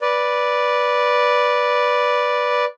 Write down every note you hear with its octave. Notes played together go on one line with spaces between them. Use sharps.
B4 D5